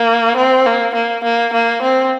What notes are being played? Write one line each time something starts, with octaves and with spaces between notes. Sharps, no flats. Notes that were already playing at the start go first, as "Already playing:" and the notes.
Already playing: A#3
C4
A#3
A#3
A#3
A#3
C4